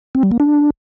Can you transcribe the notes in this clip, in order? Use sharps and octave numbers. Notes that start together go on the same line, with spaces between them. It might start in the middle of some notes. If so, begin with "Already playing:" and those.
C4
G3
A#3
D4